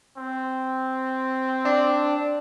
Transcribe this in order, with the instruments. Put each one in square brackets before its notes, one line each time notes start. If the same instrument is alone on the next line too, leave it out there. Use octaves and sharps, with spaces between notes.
[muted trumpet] C4
[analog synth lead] D4